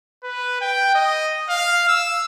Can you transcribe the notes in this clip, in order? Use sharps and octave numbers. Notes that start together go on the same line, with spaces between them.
B4
G5
D#5
F5
E6